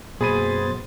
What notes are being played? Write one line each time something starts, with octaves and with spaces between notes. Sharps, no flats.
F#2 B2 A#3 G#4 C5 B5 A6 D#7